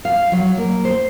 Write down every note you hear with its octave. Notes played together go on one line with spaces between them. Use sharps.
F5
F#3
A#3
C5